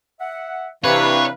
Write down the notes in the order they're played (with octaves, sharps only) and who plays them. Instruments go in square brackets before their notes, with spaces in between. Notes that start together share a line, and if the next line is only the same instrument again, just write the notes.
[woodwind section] E5 F#5
[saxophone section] C3 E3 [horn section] D4 B4 [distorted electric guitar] C#5 [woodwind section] F5